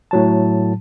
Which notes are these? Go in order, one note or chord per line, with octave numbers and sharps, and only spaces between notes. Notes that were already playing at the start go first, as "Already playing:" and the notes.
A2 F#3 A5